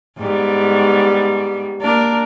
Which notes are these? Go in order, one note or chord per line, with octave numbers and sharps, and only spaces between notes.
G#2 G3 B3
A#3 D4 A#4